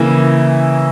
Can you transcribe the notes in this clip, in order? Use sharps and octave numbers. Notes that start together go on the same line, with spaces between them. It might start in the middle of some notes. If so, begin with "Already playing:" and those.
Already playing: C#3 E3 A#3 E4